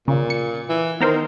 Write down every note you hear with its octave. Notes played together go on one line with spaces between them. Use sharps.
A#2 C#3
C#7
E3
D#3 B3 A#4 C5